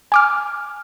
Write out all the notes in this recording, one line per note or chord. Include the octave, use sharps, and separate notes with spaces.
G#5 D6 F6